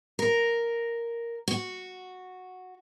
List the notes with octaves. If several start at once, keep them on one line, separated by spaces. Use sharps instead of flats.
A#4
F#4